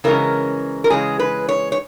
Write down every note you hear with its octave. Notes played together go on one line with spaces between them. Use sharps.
C#3 E3 G#3 C#4 A#4
A#4
C#3 E3 G#3 C#4 G#4
B4
C#5
C#5